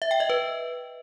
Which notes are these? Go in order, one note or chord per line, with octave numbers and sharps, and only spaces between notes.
E5
G5
D#5
B4